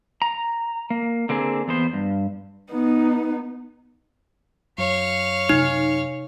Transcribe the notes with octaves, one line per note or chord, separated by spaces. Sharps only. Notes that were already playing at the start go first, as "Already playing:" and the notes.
A#5
A#3
D3 A#3 C4 G#4
E2 B3 C5
G2
B3 D#4
F#2 C#5 F5
C3 C4 D#4